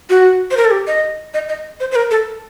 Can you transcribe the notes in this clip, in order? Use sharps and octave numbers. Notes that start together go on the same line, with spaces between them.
F#4
C5
A#4
A4
G4
D#5
D#5
D#5
C5
C5
A#4
A4